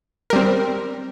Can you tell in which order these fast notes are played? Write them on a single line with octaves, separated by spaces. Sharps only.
A#4 G3 C4